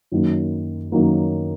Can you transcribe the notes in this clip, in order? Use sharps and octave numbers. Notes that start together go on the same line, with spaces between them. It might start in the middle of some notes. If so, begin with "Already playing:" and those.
F#2 D#3 F#3 A#3
F#2 D#3 F#3 A#3